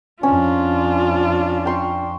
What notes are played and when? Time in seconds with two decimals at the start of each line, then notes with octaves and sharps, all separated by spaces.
0.23 F2 C#4 D4 F4 G#5
1.65 G5 C6 C#6